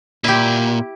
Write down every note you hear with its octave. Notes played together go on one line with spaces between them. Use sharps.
A#2 E4 G4